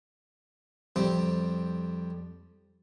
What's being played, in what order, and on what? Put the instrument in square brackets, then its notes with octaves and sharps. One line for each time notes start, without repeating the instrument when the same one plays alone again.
[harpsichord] F2 G3 C4